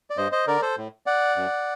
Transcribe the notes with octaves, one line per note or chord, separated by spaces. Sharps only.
D5
G2 C5 D#5
C5 D#5
D3 A#4 D5
A4 C5
A2
D5 F#5
F#2